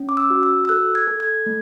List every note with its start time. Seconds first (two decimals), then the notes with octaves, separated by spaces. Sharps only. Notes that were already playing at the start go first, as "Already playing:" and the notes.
Already playing: C#4
0.09 D6
0.17 E6
0.30 F#4
0.43 E6
0.65 E6
0.69 A4 F#6
0.95 G#6
1.08 A4
1.20 G#6
1.46 A3